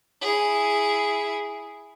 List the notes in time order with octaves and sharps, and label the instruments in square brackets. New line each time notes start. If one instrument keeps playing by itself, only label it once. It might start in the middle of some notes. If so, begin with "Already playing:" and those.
[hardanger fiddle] E4 G#4